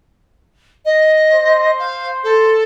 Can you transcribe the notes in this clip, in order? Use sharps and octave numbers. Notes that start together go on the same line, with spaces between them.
D#5
C5
F5
A4